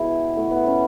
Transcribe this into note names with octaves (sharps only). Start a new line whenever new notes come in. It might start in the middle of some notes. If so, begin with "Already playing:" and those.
Already playing: B2 G#3 E4 G#4
A2 F#3 A3
B3
C#4